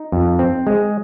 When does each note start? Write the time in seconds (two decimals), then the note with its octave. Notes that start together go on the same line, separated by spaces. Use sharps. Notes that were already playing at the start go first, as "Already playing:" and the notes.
Already playing: D#4
0.12 F2
0.39 C4
0.67 G#3